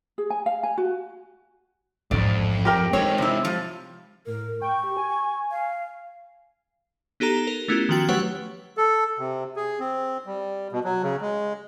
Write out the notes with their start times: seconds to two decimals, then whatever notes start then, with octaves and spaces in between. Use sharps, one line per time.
0.18 G#4
0.30 G#5
0.46 F5
0.63 G#5
0.78 F#4
2.11 A1 F2 G#2 G#3 D5
2.65 G4 A#4 G5
2.93 G#3 C4 D#4 C#5
3.18 C3 E4
3.45 F3
4.27 A2 A#4
4.62 G5 C#6
4.84 G4
4.97 G#5
5.51 F5
7.20 B3 D#4 G4 A4 A#5
7.47 A#4
7.68 A3 B3 C#4 E4 F4 G4
7.89 D#3 F3 F#4 G5 A6
8.09 F#3 A3 G4 B4 C#5 F#5
8.77 A4
9.19 C3
9.56 G#4
9.80 C4
10.26 G3
10.72 B2
10.84 F#3
11.03 C#3
11.21 G#3